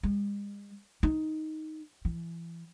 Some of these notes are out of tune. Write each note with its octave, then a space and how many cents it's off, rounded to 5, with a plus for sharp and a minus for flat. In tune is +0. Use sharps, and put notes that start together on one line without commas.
G#3 -45
D#4 +5
E3 +30